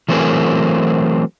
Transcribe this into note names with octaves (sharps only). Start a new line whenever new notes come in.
E3 F#3 A3 C4 G#4 A#4